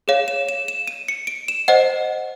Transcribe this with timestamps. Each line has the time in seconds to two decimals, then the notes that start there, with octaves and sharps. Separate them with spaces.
0.08 G#4 C#5 F5 E7
0.28 E7
0.49 E7
0.68 E7
0.87 D#7
1.08 C#7
1.27 D7
1.48 E7
1.68 C5 D#5 F#5